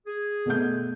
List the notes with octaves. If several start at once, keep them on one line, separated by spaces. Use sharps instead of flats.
G#4
B2 A3 G6